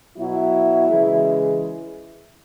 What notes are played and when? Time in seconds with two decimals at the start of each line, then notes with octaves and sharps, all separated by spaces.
0.17 B2 F#3 E4
0.87 C#3 E3 G#3